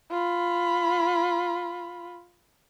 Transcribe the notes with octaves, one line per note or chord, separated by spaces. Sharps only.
F4 B5